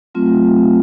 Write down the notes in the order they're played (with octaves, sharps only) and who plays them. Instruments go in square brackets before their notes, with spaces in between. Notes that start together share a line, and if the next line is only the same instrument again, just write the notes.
[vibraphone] F#3 A3 C4 F4